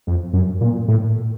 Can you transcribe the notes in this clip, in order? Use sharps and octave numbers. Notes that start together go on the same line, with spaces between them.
F2
F#2
A#2
A2